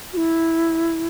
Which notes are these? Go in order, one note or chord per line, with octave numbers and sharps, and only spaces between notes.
F#4
E4